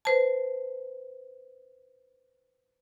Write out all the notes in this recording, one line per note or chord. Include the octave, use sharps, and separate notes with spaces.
B4 C5 A5